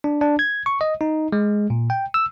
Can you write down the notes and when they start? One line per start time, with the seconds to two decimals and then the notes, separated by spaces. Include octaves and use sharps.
0.04 D4
0.21 D4
0.39 G#6
0.66 C#6
0.81 D#5
1.01 D#4
1.32 G#3
1.70 A#2
1.90 G5
2.14 E6